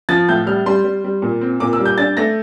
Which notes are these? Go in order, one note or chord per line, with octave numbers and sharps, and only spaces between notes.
F3 A6
A2 G6
G3 F6
G3 C6
G3
G3
A#2
C4
A#2 D6
E6
G3
G6
D4 A6
A3 A#6